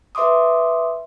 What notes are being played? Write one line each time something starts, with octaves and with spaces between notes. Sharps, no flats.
B4 E5 C6 D6 D#6